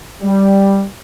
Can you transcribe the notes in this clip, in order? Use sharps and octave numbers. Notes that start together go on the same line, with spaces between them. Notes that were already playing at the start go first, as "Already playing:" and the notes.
G3